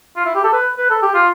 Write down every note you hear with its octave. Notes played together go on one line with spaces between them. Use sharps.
F4
E4
G4
A4
B4
B4
A4
G4
F4